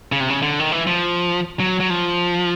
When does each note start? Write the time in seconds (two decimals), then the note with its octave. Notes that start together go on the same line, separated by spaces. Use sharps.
0.12 C#3
0.20 C3
0.30 C#3
0.42 D3
0.59 D#3
0.72 E3
0.87 F3
1.60 F#3
1.80 F#3
1.90 F3